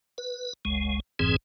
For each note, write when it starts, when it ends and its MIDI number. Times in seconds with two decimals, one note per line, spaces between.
0.18 0.53 71
0.65 1.00 30
0.65 1.00 37
0.65 1.00 56
1.19 1.36 31
1.19 1.36 41
1.19 1.36 44
1.19 1.36 52
1.19 1.36 60
1.19 1.36 68